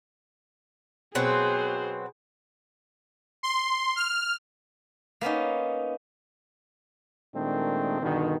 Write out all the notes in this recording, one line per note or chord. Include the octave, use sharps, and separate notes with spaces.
B2 F#3 C4 G#4 C5
C6
F6
A#3 B3 C#4 D#4
A#2 D#3 G#3 A3 C4 D4
G2 B2 D3 D#3